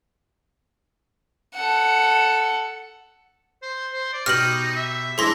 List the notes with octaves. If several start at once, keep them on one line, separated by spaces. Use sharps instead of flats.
A4 F#5
C5
C5
D5
B2 D#4 G4 F6 A#6 F#7
E5
E3 G#3 D4 G#4 C6 A#6